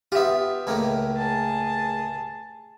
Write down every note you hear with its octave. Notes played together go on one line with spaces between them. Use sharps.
B3 F4 G4 E5
C#2 A2 A#3
G#4 A5